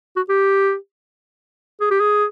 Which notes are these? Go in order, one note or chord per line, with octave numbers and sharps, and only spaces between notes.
F#4
G4
G#4
G4
G#4